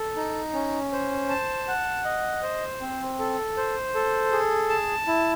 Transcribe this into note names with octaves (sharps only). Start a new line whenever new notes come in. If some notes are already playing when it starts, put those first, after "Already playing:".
Already playing: A4
D#4
C#4
C5
A5
F#5
D#5
C5
C4
A4
C5
A4
G#4
A5
E4